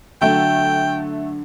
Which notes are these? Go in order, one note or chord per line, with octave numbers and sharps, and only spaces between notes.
D3 F#3 A3 G5